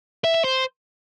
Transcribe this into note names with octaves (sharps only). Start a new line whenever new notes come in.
E5
E5
C5